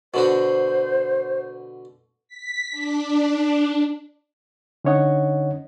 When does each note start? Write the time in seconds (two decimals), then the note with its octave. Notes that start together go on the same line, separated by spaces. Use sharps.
0.14 B2 D3 F#4 C5
2.28 B6
2.71 D4
4.85 D3 C#4 D#4 C#5 D#5 F#5